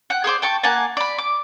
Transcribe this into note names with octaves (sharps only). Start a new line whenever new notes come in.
F#5 G5
G#4 A4 C5 D5
G5 A5 C#6
A#3 F#5 G#5 A5
D5 B5
D6